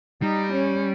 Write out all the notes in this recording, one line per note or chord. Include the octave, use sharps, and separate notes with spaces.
G3 D#4
C#4